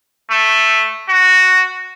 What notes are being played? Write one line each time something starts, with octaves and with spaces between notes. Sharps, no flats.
A3
F#4